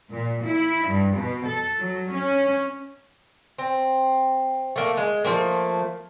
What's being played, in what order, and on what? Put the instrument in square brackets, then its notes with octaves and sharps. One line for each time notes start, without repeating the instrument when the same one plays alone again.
[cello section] A#2
E4
G2
B2
A4
F#3
C#4
[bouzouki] C4
A3 A#3
G#3
F3 A3 A#3